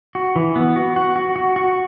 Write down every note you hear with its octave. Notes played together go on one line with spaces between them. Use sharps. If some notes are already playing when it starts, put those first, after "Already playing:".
F#4
E3
B3
F#4
F#4
F#4
F#4
F#4